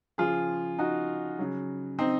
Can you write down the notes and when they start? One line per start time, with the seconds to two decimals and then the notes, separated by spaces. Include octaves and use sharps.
0.18 C#3 F3 F4 G#4
0.78 D#4 F#4
1.39 C#3 F#3
1.99 C4 D#4